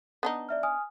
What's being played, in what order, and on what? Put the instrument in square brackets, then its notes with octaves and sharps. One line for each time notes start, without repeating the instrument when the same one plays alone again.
[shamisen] B3 D4 D#4
[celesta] D5 E5 F6
G#5 D#6 F6